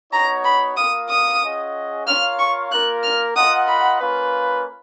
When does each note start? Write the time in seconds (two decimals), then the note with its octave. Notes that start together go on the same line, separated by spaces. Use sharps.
0.12 B3 D#4 F#4 C#5 A#5
0.44 B5
0.77 A#3 F4 A#4 F5 D#6
1.09 D#6
1.43 C#4 F4 G#4 D#5 F#5
2.07 F4 A#4 C#5 F5 F6
2.39 C#6
2.71 A#3 F4 A#4 F#6
3.03 F6
3.36 F4 A#4 D#5 F#5 D#6
3.68 B5
4.01 A#3 C#4 F4 B4